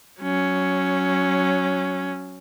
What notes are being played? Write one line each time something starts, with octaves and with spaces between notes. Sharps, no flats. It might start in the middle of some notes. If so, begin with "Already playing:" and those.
F#3 C#4